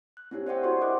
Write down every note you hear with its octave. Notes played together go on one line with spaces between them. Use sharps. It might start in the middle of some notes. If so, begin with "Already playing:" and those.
F#6
C4 D4 E4 G4 C#5
C5 D5 E5 F#5 G5
F#4 A4 C5 C6 C#6
A#4 D#5 E5 D6 F#6